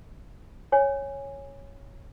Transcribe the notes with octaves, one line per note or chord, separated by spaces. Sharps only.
C#5 G#5